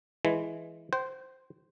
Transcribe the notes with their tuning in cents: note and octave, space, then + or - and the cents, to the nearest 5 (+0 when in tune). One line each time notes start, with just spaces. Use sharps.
E3 +0 G#3 +10
C5 +0 G5 -40